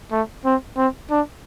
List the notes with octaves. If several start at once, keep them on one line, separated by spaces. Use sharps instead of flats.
A3
C4
C4
D4